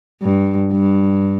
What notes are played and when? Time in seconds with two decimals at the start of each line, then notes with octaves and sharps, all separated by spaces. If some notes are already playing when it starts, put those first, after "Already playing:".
0.23 G2
0.72 G2